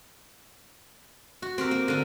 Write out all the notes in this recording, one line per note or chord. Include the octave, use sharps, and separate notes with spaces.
F#4
C4 G4 A#4
A#3
D3 A#3